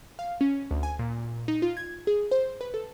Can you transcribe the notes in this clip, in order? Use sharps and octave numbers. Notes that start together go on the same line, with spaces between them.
F5
C#4
D2
G#5
A#2
D#4
F4
G#6
G#4
C5
B4
A4